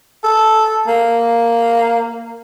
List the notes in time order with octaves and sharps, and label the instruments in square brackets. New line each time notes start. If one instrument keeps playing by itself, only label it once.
[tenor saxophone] A4
A#3